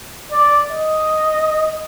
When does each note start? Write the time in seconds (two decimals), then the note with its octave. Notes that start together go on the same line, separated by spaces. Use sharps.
0.32 D5
0.71 D#5